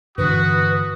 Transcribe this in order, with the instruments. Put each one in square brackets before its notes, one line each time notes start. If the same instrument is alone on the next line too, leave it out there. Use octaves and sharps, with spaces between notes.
[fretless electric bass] G2 D3 E3 [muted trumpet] F#4 [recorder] B4 [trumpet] D#6